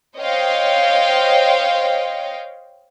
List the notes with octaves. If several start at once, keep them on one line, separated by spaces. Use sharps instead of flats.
C5 C#5 D#5 F5 G5